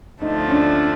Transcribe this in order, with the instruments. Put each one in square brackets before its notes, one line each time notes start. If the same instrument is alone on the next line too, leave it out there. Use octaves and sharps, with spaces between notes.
[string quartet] D2 D3 F3 A3 [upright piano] D#4
[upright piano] C#4
D4